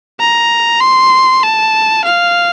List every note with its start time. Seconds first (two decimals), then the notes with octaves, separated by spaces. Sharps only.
0.20 A#5
0.81 C6
1.43 A5
2.04 F5